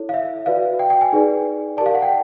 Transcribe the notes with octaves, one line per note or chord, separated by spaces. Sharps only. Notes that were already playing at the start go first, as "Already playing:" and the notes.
Already playing: E4 A4 C#5
F5
E5
F#4 B4 D5 F5
G5
G5
G#5
D#4 G#4 B4 D5
G4 A#4 D5 A5
F5
F#5
G5